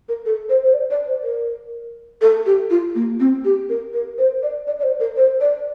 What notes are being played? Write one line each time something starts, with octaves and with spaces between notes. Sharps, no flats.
A#4
A4
C5
C5
D5
D5
C5
A#4
A4
G4
F4
A#3
C4
G4
A#4
A#4
C5
D5
D5
D5
C5
A#4
C5
D5